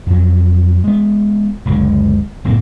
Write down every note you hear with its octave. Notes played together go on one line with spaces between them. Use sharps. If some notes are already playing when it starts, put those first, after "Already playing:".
F2 F#3
G#3 B3
F#1 C#2 D3 G#3
F#1 A2 A#3 C4